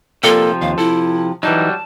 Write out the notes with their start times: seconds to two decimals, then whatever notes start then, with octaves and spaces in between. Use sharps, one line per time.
0.23 C3 F3 A#3 F4 A4 D5
0.62 D#2 F5
0.78 E4 A4
1.43 E3 F#3 G3 D#4 A5